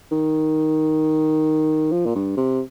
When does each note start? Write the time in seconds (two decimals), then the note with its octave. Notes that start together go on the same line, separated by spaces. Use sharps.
0.11 D#3
1.92 F3
2.06 A#2
2.16 G2
2.37 C3